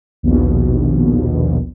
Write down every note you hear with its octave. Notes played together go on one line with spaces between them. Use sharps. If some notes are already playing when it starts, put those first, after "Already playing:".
A#1 D#2 B2